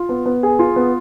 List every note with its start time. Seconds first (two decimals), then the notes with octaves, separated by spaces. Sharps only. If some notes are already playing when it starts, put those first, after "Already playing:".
Already playing: F4
0.09 B3
0.26 B3
0.43 G#4
0.59 F4
0.76 B3